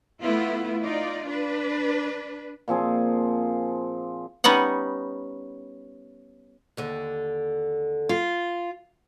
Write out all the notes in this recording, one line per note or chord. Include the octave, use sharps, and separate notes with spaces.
A3 B3 E4 F4
D#4 F4 D5
D4 B4
A#2 F3 C4 G#4
G3 B3 C#4 D#4 F#5
D#2 D3
F4